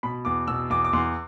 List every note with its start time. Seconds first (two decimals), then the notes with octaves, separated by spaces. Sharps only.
0.03 B2 B5
0.25 E2 D6
0.48 B2 E6
0.70 E2 D6
0.85 D6
0.93 E2 C6